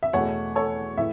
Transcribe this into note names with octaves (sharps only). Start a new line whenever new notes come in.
E5
E2 B2 A3 C#5 F#5
A4 C#5
A2 E3 E5